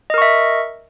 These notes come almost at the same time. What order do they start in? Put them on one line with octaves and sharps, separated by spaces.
D#5 A#4 C#6 E5